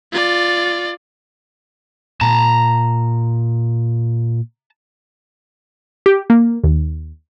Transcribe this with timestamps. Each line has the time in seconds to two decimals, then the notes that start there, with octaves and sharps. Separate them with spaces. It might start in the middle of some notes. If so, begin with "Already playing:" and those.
0.12 F4 D5
2.21 A#2 A5 A#5
6.06 G4
6.30 A#3
6.64 D#2